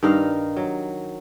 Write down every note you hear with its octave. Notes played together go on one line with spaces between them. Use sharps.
G2 D#3 D#4 F5
F#3